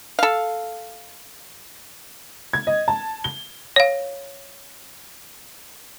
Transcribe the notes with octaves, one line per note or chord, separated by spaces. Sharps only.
A4 F5
G#6
D#5
A5
G7
C#5 F5